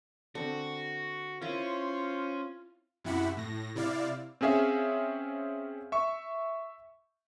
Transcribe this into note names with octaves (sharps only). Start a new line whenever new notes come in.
D3 C4 F#4
C#4 E4 F4 A#4 C5
F#2 C3 E4 F#5 B5
A2 A#6
C3 E4 D5 F5
C4 C#4 G#4 E5 F5
E5 C#6